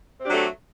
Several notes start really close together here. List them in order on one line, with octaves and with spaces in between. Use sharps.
C4 G4 D4 F#3 A3